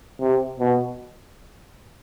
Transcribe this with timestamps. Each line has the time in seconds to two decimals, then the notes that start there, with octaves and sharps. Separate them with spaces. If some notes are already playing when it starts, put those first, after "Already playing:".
0.21 C3
0.60 B2